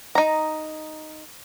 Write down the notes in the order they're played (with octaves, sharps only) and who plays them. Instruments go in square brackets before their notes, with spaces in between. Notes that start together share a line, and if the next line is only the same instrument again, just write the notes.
[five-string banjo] D#4 A#5